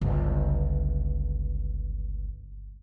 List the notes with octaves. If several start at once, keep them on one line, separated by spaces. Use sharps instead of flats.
G1 C#2